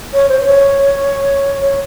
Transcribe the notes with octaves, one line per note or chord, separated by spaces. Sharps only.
C#5
C5
C5
C#5
C#5